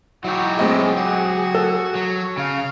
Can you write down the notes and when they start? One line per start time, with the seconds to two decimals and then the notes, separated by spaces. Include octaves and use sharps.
0.24 G#2 F#3 D#4 E4 F#4 G4
0.59 A2 G#3 A3 C4 G#4 D#5
0.97 F#4
1.55 A4
1.95 F#3
2.37 C#3 F5